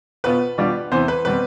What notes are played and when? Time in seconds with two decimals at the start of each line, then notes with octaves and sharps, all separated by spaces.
0.24 B2 B3 F4 B4
0.58 B2 G3 D4 F4
0.91 E2 C3 E3 B3 C5
1.08 B4
1.25 B2 G3 C4 B4